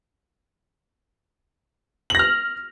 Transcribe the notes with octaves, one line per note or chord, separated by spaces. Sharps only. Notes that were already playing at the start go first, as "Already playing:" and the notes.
F6 A#6 F#7